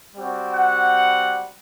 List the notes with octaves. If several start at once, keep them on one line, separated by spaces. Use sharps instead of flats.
G3 C4 F#4
F#5